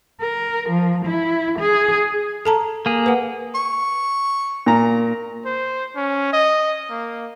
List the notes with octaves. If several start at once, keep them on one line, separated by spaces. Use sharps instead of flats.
A#4
F3
E4
G#4
A4 A5 A#5
A#3 G#4
B4 F#5
C#6
A#2 A#5
C5
C#4
D#5
A#3